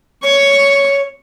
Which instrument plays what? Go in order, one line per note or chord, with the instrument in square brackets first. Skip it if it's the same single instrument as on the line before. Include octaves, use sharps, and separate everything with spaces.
[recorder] C#5 [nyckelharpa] C#6